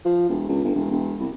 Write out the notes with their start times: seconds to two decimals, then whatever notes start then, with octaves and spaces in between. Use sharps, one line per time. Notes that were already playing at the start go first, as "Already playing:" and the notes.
0.05 F3
0.29 E1
0.49 C#2
0.64 G1
0.76 E1
0.91 E1
1.20 C2